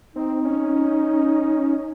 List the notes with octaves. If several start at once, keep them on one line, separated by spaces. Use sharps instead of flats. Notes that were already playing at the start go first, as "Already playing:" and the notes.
C4 D#4
C#4